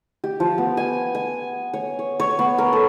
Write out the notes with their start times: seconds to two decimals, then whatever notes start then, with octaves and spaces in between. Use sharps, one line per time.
0.24 G4
0.40 F3
0.58 B3
0.77 G#5
1.15 G#5
1.74 C#5
1.99 C#5
2.20 C#5
2.39 B3
2.58 A#4
2.73 A4